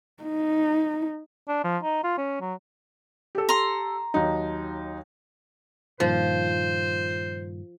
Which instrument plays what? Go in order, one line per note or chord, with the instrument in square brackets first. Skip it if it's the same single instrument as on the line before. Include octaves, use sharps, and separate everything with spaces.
[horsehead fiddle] D#4
[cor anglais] D4
F3
D#4
F4
C#4
F#3
[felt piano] G4 A4
[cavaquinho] A#5 C6
[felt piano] D#2 F#3 D#4
[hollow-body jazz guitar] G2 A#2 D#3 [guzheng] F3 [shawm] C5